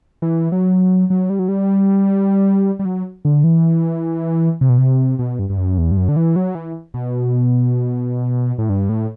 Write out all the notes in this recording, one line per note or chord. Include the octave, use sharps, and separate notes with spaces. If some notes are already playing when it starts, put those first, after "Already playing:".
E3
F#3
F#3
G3
F#3
G3
G3
F#3
D3
E3
C3
B2
C3
B2
G2
G2
F#2
E2
G2
F#2
D3
E3
F#3
E3
B2
A2
G2
A2